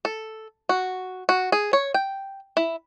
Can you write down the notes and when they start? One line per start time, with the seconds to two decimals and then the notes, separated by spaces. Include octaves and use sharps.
0.05 A4
0.69 F#4
1.29 F#4
1.52 G#4
1.73 C#5
1.94 G5
2.57 E4